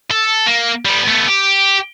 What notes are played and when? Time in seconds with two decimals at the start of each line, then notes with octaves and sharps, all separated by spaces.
0.11 A4
0.46 A#3
0.85 G3 B3
1.08 A3 B3
1.28 G4